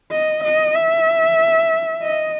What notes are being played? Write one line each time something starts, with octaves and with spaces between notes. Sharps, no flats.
D#5
D#5
E5
D#5